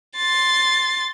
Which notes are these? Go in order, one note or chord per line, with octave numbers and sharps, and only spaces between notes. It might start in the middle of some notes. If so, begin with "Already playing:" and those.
C6 A6